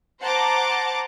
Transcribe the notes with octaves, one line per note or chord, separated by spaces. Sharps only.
C5 F#5 A5 A#5 D6